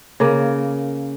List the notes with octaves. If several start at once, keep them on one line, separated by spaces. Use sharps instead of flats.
C#3 A#3